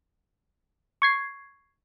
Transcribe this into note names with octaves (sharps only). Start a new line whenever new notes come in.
C#6 G#6 C7